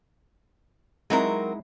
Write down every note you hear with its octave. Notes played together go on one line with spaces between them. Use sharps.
F#3 G#3 C4 D#4 E4 A#4